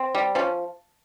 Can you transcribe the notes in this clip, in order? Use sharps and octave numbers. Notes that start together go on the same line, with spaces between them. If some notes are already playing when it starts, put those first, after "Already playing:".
Already playing: C4
G3
F3 C#4